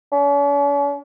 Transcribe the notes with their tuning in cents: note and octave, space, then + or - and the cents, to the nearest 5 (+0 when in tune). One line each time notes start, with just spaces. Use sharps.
C#4 +45